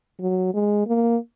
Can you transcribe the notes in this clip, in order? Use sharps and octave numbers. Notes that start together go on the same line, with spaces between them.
F#3
G#3
A#3